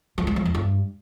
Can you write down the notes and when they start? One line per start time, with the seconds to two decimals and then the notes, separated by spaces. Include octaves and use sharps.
0.18 F3
0.27 G3
0.36 F3
0.45 F2
0.55 G2